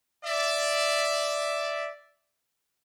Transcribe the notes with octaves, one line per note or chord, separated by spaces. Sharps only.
D5 E5